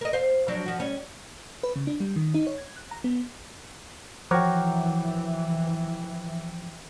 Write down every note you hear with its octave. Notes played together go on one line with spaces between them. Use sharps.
A#4 D#5
C5 F5
F3 F#3 D4
F3 F#4
G3 C#4
B4
C#3
D4
G3
D#3
D#4
C#5
G#6
F#6
A#5
B3
E3 F3 F#4 A#4 C#5 G5 D6